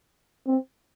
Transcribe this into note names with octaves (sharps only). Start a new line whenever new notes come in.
C4